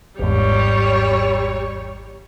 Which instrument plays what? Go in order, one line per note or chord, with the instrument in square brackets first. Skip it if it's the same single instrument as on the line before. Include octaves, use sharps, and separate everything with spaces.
[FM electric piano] G#1 E2 G#2 [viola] G3 C#5